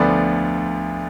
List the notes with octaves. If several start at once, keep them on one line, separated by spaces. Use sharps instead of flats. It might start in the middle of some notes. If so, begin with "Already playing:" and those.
Already playing: D2 D3 F3 B3 D5